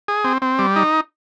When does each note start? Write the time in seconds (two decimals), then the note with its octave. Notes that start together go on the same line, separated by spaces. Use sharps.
0.08 G#4
0.24 C4
0.42 C4
0.59 G3
0.76 D#4